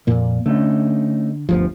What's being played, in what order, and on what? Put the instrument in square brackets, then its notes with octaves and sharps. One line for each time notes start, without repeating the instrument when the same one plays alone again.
[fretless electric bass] F2 A#2 A#3
[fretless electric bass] D3 [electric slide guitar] A3 C#4 D#4
[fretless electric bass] G1 D2 F3